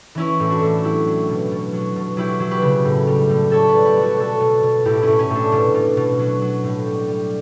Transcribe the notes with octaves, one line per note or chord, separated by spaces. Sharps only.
E3 C#4 E4
A2
D4 F#4
A2
F#3 E4 G4
F#3
B2
B2
F#3
B2
F#3 E4 G4
F#3
G4 B4
C#3
A2
G3
A2
G3 A4 C#5
G3 B4 D5
G4 B4
G3
F#4 A4
B2 F#4 A4
B2
B2
A2 E4 G4
C#4 E4
A2
C#4
A2
D4
B2
B2
B2
F#3
F#3
A2
G3
G3